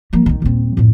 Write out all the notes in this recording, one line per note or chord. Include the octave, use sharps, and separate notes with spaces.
F3 A#3
C2 D#3
D#1 C4
F2 A2